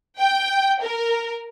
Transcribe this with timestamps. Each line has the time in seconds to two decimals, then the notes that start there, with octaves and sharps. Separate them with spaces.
0.19 G5
0.81 A#4